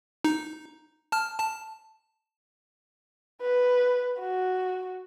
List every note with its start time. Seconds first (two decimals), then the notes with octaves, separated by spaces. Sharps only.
0.24 D#4
1.12 A5 F6
1.39 A5
3.41 B4
4.20 F#4